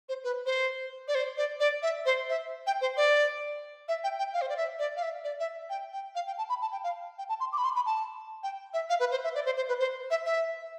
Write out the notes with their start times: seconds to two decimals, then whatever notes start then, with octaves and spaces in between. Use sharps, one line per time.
0.09 C5
0.24 B4
0.46 C5
1.08 D5
1.15 C5
1.37 D5
1.60 D5
1.82 E5
2.05 C5
2.29 E5
2.67 G5
2.81 C5
2.97 D5
3.88 E5
4.04 G5
4.19 G5
4.33 F5
4.41 C5
4.49 D5
4.57 E5
4.79 D5
4.96 F5
5.02 E5
5.24 D5
5.40 E5
5.70 G5
5.92 G5
6.15 F5
6.27 G5
6.38 A5
6.49 B5
6.61 A5
6.72 G5
6.84 F5
7.18 G5
7.29 A5
7.40 C6
7.52 D6
7.58 B5
7.64 C6
7.76 B5
7.86 A5
8.43 G5
8.73 E5
8.89 F5
9.00 B4
9.11 C5
9.24 E5
9.35 D5
9.45 C5
9.57 C5
9.68 B4
9.80 C5
10.11 E5
10.25 E5